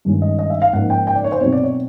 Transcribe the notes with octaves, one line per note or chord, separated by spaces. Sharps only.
G2 D#3 G#3 C#4
D#5
D#5
E5
F5
G#2 F3 A#3 C#4 F#5
G5
G5
D5
C#5
C5
B2 F#3 A3 C4 C#5
D5
C#5